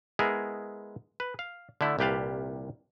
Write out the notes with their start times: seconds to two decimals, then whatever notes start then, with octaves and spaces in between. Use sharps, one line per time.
0.19 G#3 B3 E4 G#4 A#4
1.20 B4
1.39 F5
1.81 D3 A3 E4
1.99 C2 A#2 G4 B4 F5 A5